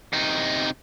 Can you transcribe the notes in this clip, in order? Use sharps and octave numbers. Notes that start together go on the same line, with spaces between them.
C3 D#4